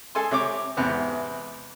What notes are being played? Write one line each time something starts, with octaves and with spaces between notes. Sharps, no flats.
G#4 A4 G#5 C6
C3 C#5 D6
E2 G#2 C3 B3